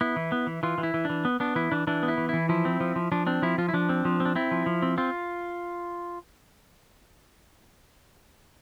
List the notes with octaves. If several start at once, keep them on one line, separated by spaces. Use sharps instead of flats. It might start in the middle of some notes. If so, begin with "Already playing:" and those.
B3 E4
E3
B3
E3
E3 F4
E3
E4
E3
E3 D4
B3
B3 D4
E3 E4
E3 D4
E3 D4
B3
E4
E3
E3 E4
F3 E4
C4
F3
F3
F3 D4
C4 D4
F3 E4
F3 F4
E4
F3 D4
C4
F3
C4
D4
C4 E4
F3
F3
C4
C4 F4